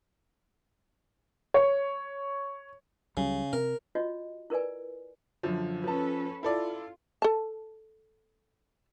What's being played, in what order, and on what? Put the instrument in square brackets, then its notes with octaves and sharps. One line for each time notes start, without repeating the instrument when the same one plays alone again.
[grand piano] C#5
[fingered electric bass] C#2 F#3 G3 [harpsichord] C#3
[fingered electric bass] C3 [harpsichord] A#4
[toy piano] F4 F#4 C#5 D#5
E4 A#4 B4 D5 G#5
[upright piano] F#2 D3 F3
[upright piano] F3 A5 [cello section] C#4 A4 B4
[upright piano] E4 A4 D5 [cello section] F4
[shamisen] A4 A5